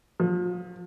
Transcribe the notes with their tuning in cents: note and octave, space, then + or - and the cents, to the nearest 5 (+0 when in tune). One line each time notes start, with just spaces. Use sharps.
F3 +40